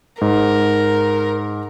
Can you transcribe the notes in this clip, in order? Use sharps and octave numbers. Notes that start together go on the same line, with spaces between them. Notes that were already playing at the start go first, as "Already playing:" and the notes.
G#2 A#4